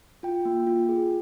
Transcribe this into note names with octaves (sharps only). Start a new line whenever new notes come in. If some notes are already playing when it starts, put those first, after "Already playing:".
F4 G5
A#3
F4
G#4